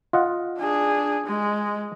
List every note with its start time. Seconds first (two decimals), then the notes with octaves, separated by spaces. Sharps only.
0.13 F4 D#5 F#5
0.59 D4 G#4
1.26 G#3